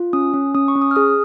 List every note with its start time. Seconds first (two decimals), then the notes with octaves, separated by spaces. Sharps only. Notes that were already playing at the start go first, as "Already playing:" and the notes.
Already playing: F4
0.13 C#4 D#6
0.34 C#4
0.55 C#4 D#6
0.68 C#6
0.76 C#4
0.82 D#6
0.91 F6
0.96 G#4 D#6